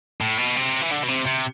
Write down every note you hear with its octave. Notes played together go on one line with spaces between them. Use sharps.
A2
B2
C3
E3
D3
B2
C3
C3